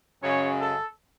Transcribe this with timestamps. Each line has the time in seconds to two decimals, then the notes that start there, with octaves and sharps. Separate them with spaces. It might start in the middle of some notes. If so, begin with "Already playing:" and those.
0.22 F#2 C#3 G#3 C#5
0.60 A4